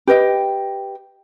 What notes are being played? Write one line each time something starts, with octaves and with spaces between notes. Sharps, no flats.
G4 B4 D#5 G5